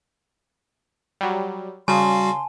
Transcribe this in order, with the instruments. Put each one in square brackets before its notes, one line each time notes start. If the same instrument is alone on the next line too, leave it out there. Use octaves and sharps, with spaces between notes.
[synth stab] F#3 G3
[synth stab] C#3 [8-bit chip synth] G3 F#4 F5 [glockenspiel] G#5 A5 [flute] C6